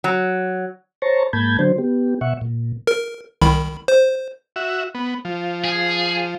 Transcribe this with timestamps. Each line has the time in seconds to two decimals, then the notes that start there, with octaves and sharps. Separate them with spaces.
0.04 F#3
1.02 C5 C#5 A5 A#5 C#6
1.33 G#2 A#3 A5 B5 G6 G#6
1.59 D3 F#3 D4 C5
1.78 B3 G4
2.21 B2 E5 F#5 C#6
2.41 A#2
2.87 A#4
3.42 C2 D#3 B5
3.88 C5
4.56 F#4 E5
4.95 B3
5.25 F3
5.64 G#4